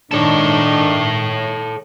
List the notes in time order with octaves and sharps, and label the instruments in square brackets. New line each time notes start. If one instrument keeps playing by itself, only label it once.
[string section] G#2 D#3 [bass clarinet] D4 [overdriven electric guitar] A4 C#5